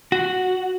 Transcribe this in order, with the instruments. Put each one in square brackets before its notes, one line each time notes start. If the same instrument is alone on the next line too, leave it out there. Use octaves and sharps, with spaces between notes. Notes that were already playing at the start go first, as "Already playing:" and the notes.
[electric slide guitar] F#4